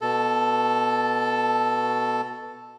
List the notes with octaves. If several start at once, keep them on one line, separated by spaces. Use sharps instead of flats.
B2 A4